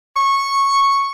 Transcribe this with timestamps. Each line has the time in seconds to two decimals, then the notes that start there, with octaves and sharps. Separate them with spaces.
0.16 C#6